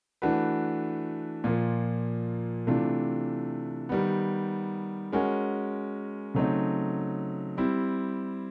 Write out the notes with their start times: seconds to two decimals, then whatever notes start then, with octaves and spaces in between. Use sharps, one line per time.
0.22 E3 A3 D4 F#4 B4
1.44 A#2 F3 A#3
2.67 C3 E3 A3 D4 F4
3.89 D#3 G3 B3
5.13 G#3 C#4 F#4 A#4
6.34 C#3 F#3 A3 C4 D#4
7.58 G3 C4 E4